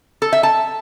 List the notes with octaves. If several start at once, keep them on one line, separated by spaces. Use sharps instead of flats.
A4
E5
A5